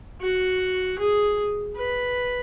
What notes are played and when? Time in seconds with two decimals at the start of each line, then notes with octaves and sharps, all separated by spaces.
0.21 F#4
0.99 G#4
1.76 B4